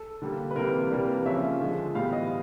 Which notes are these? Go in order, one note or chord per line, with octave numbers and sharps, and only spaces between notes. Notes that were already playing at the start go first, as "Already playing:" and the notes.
Already playing: A4
D3 G3 A#3
B4
C3 E3 G3 A#3 A#4
C3 E3 G3 A#3 D4
C#3 F3 A#3 C#4 E5
D3 F3 G#3
A2 E3 G3 B3 F5
D#5